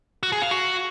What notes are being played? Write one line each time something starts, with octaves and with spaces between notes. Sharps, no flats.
F#4
G#4
F5
F#4